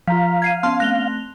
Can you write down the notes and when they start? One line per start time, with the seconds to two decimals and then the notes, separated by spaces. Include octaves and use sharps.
0.08 F3 F4 F5 A#5 B6
0.42 G#6 C7 D#7
0.63 B3 C#4 A5 C6 F6
0.80 A3 C4 F#6 A#6 F7 G7